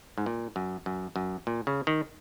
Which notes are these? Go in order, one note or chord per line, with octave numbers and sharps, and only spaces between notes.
G#2
A#2
F#2
F#2
F#2
A#2
C#3
D#3